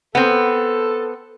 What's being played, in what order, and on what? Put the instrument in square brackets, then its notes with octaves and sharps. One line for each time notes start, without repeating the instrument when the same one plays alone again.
[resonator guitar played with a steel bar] B3 C4 [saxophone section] A4